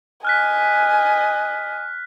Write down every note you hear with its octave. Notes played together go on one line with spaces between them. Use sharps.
D#5 G#5 F6 F#6 B6